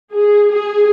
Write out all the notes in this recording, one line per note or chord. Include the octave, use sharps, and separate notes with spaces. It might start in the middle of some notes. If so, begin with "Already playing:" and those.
G#4
G#4